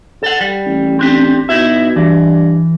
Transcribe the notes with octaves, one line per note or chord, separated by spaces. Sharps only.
A4 F#5
G3
A1
C4 D4 G4
B2 D#4 E4 E5
G2 E3